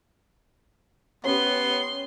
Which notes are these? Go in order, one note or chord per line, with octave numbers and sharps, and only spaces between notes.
B3 C#4 G4 C6